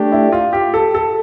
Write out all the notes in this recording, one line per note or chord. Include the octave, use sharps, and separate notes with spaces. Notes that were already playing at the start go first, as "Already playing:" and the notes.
Already playing: A3 D4 G4
E4
F4
G4
A4
A4